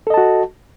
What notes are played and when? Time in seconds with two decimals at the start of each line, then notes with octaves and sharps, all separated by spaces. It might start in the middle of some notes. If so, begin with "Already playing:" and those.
0.07 A4
0.10 D#5
0.14 A5
0.18 F#4